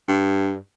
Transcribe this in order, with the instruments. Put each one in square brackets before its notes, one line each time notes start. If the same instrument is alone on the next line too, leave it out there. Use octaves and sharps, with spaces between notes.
[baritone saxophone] G2